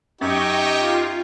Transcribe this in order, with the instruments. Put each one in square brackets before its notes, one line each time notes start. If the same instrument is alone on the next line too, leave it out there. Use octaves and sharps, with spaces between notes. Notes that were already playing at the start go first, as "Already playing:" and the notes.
[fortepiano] F#2 [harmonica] D#4 G4 [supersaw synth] D#5 G5 C#6
[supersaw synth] F4